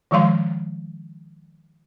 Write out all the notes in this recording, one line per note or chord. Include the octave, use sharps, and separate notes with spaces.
D#3 F3 G#3 F5 C6